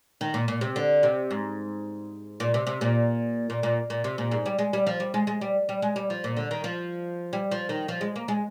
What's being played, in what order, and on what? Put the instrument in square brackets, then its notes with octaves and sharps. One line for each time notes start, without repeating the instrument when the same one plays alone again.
[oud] D#3
A#2
A#2
C3
D3
C3
G#2
A#2
C3
C3
A#2
A#2
A#2
A#2
C3
A#2
G#2
G3
G#3
G3
F3
G3
G#3
G#3
G3
G3
G#3
G3
F3
A#2
D3
D#3
F3
G3
F3
D#3
F3
G#3
A#3
G#3